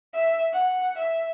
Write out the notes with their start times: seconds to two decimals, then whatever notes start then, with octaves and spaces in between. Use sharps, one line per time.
0.14 E5
0.53 F#5
0.98 E5